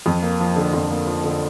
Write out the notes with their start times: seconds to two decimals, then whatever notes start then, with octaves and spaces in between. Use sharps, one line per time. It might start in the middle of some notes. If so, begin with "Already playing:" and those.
0.06 F2
0.22 A#3
0.40 F3
0.56 D3
0.73 F2
0.91 A#3
1.07 F3
1.24 D3